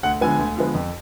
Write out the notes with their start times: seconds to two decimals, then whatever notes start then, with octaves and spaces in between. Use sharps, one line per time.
0.03 D2 F#5
0.21 D3 F3 G#3 B3 G#5
0.39 D2
0.57 D3 F3 G#3 B3
0.75 F2